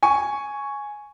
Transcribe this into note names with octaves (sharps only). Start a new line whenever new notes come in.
G#5 C#6